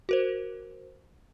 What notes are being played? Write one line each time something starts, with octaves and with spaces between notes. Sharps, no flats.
F#4 A#4 C5